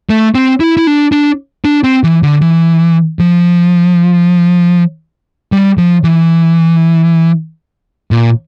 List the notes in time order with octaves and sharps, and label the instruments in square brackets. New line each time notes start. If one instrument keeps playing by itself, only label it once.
[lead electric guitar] A3
C4
E4
E4
D4
D4
D4
C4
E3
D3
E3
F3
G3
F3
E3
A#2